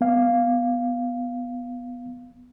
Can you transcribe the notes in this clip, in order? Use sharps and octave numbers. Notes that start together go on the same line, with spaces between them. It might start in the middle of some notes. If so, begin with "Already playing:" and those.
B3 F5